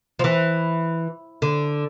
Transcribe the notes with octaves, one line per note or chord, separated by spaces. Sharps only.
F3
E3
D3